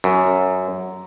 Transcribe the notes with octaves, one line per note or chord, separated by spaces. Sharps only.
F#2